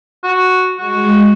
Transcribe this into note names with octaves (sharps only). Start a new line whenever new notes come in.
F#4
G#3 F#4